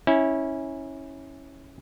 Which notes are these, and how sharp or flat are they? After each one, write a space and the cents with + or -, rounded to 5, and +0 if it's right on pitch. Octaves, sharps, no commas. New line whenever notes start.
C#4 -10 E4 -25